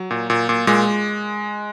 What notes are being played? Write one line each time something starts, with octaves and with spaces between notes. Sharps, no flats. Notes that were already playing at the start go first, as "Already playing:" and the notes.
Already playing: F#3
A#2
A#2
A#2
A#2 G#3